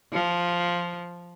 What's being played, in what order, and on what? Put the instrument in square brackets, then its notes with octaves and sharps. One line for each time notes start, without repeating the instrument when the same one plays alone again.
[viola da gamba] F3